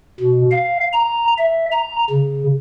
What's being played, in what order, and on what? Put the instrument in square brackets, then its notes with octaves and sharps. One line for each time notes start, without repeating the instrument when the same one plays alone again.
[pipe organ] B2
F5
A#5
E5
A#5
C#3